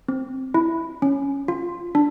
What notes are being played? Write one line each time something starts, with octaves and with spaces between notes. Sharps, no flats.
C4
E4
C#4
F4
D4